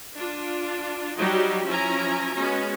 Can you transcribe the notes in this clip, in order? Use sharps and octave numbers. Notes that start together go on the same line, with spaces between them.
D4 F4
F#3 G3 D#4 F#4 G4
F3 F#3 C#4 E4 G#5 A#5
G#3 B3 C#4 F#4